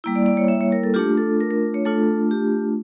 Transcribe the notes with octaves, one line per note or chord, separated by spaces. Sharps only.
G3 A#3 E4
D5
D5
C#5
E5
C#5
A#4
A4
A3 D4 F4 G4
A4
A#4
A#4
C#5
A3 D4 F4 A4
G4